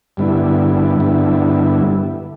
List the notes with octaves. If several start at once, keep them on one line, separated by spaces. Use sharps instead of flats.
G2 D3 G3 B3 E4
G2 D3 G3 B3 E4